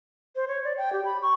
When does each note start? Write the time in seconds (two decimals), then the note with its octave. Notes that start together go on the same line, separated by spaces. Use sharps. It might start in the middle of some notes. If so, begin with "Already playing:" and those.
0.36 C5
0.48 C#5
0.64 D5
0.78 G5
0.93 G4
1.05 B5
1.22 C#6